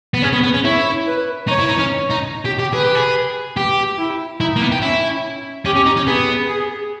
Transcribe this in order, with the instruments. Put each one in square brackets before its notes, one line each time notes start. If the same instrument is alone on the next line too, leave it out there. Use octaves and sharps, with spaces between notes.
[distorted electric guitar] B3
[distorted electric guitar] C#4 [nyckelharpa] G#4
[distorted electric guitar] B3
B3
C#4
[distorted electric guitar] E4 [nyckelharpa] C#5
[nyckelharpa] B4
[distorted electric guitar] D#4 [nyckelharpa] C#5
[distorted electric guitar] E4
D#4
C#4
D#4
G4
G4
[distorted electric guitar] G#4 [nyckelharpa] B4
[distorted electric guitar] G4
G#4
G4
[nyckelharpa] E4
[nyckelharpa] D#4 [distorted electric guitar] E4
[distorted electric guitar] A#3
B3
G4
[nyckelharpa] C#4 [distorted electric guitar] E4
[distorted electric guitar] C#4 [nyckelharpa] G4
[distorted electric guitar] C#4
D#4
C#4
[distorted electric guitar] B3 [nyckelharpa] G#4
[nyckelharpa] G#4